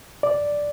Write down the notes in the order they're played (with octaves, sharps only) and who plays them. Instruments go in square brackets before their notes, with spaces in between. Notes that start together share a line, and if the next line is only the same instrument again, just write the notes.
[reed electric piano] D5